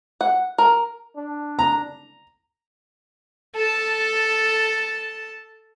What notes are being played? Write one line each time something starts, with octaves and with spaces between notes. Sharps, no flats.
F#5
A#4
D4
A#5
A4 A5